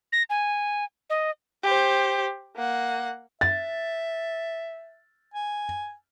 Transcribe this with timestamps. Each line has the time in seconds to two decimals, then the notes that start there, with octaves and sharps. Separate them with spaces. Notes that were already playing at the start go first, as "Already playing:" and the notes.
0.12 A#6
0.30 G#5
1.10 D#5
1.63 G4 C5
2.56 A#3 F#5
3.41 E5 A6
5.34 G#5